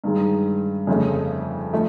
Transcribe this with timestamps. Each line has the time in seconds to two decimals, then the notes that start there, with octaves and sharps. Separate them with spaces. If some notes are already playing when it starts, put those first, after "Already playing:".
0.04 G2 D#3 G#3
0.87 F2 C#3 F3 A3
1.73 F3 A3